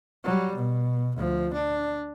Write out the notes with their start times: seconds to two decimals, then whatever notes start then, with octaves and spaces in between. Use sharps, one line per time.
0.24 F#3 G3
0.56 B2
1.16 D2 F3
1.54 D4